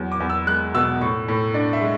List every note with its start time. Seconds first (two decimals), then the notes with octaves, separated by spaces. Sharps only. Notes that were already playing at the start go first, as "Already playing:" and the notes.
Already playing: E2 F#3
0.12 D6
0.20 E2
0.30 E6
0.47 G#3 F#6
0.75 B2 E6
1.01 A2 C#6
1.28 A2
1.54 D4
1.73 E5
1.81 G#3